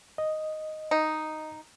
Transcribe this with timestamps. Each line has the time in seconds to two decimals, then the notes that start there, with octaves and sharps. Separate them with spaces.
0.18 D#5
0.91 D#4